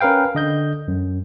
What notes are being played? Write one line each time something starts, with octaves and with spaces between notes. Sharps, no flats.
C#4 A#4 B4 F5 G5
D3 D#5 G6
F#2